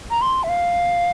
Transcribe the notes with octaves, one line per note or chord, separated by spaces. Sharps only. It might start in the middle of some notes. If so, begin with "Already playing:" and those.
A#5
C6
E5
F5